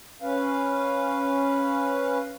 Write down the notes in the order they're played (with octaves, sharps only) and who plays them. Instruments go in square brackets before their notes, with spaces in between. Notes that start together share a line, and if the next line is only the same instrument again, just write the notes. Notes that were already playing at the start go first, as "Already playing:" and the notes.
[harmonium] C#4 B4 F5